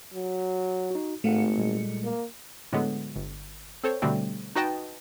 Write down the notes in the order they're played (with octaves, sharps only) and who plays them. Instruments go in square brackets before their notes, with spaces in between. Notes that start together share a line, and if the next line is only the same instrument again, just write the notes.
[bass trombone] F#3
[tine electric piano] D#4 F#4
[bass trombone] G#1 [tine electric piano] A2 F5 F#5 [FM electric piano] A3 C#7
[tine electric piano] A#2 G3 G#3
[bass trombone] A#3
[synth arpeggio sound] A2 D3 F#3 G#3 B3
G1
C4 A4 C5 C#5
B2 D3 G3 A3 C4
D#4 F#4 B4 D#5 G5 A5